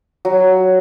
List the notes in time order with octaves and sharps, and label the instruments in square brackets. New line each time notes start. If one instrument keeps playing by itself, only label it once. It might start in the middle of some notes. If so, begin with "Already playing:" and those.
[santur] F#3